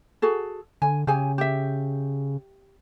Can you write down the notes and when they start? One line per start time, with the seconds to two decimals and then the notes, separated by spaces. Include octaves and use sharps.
0.22 F#4 G#4 A4
0.82 D3 G#5
1.07 C#3 G4 G#4 G#5
1.38 G4 E5